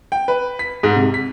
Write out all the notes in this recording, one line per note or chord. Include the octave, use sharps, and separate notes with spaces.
G5
B4
B6
G#2
C3
B6